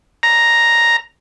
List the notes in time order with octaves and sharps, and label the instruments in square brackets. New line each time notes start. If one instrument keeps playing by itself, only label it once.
[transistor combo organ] A#5